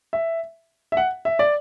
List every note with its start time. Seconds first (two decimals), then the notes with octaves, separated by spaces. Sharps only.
0.13 E5
0.92 E5
0.97 F#5
1.25 E5
1.39 D5